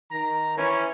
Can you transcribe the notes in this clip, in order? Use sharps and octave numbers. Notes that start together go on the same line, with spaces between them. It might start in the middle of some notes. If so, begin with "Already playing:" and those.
D#3 A#5
E3 C#4